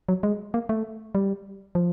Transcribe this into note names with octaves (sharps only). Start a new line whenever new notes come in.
F#3
G#3
A#3
A3
G3
F3